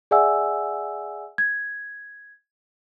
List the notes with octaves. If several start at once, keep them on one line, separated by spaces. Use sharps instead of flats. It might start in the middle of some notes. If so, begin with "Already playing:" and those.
G#4 D5 E5 F#5 G#5 E6
G#6